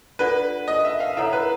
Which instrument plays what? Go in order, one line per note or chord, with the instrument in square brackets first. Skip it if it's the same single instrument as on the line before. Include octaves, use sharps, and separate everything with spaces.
[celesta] D4 F4 A4 D5 F#5 [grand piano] B4
[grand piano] D#5
E5
F5
[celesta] E4 A4 C#5 F#5 A#5 [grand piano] E5
[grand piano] B4